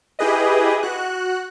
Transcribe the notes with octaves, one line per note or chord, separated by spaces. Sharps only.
E4 G4 G#4 B4 D#5
F#4 F#6